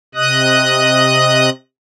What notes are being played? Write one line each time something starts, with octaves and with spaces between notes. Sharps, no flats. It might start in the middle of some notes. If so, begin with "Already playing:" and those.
C3 D#5 D#6 F#6